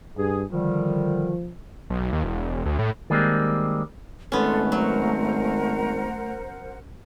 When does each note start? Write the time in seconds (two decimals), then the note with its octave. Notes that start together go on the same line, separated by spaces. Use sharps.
0.18 G2 G#4
0.52 D3 D#3 F3 G3
1.90 B1
2.12 D#2
2.24 E1
2.66 D2
2.79 A2
3.10 D#3 G3 G#3 A#3 C4
4.32 G#1 A3 B3 C#4 A4 C6
4.72 F#3 A#4 C5 F#5